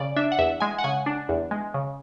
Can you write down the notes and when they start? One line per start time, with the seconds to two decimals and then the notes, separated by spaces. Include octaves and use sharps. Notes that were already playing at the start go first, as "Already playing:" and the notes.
Already playing: C#3 D5
0.16 D4 E5
0.32 F#5
0.39 E2 E5
0.60 G#3 G#5
0.78 F#5
0.84 C#3 G#5
1.06 D4
1.29 E2
1.51 G#3
1.74 C#3